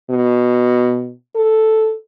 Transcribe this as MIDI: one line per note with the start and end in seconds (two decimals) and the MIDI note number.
0.10 1.12 47
1.36 1.95 69